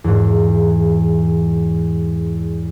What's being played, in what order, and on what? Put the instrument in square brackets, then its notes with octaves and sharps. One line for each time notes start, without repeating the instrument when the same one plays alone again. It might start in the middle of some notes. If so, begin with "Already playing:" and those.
[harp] E2 G#2